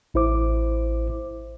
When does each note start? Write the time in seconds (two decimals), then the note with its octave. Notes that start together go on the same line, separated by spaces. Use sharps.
0.14 A1 E4 C5 D6